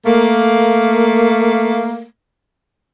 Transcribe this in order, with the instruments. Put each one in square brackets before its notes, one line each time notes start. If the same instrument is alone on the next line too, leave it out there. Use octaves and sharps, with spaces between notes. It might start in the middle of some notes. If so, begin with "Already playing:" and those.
[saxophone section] A3 A#3